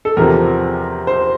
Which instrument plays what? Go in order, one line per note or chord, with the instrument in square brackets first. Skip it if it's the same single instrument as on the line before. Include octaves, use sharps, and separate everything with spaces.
[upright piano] A4
E2 C3 F3 C4 A#4
C5